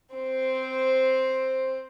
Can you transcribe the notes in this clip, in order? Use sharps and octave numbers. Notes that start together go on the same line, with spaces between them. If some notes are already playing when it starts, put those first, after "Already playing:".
C4 C5